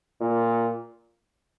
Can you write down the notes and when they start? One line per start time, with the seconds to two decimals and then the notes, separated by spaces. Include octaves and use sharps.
0.21 A#2